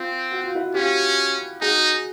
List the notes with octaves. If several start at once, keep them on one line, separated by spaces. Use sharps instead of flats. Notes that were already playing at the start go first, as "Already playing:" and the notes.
Already playing: C4 F4
F#4
F4
E4 F#4
C#4 F4 G4
D#4 F#4 G#4